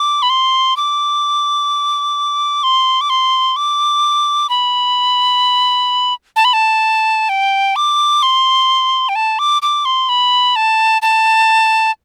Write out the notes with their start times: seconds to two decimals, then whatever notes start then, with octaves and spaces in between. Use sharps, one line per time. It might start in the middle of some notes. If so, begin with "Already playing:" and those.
Already playing: D6
0.22 B5
0.30 C6
0.77 D6
2.63 C6
3.01 D6
3.10 C6
3.56 D6
4.50 B5
6.36 A5
6.45 B5
6.53 A5
7.29 G5
7.76 D6
8.23 C6
9.09 G5
9.16 A5
9.39 D6
9.62 D6
9.85 C6
10.09 B5
10.56 A5
11.02 A5